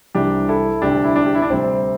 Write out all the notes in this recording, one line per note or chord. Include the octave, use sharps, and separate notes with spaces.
C2 C3 E3 G3 D4 G4
E4 A4
D2 C3 G3 D4 G4
E4
D4
G4
E4
D4
D2 C3 G3 C4